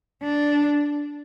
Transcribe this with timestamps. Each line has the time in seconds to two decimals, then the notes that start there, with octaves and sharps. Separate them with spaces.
0.23 D4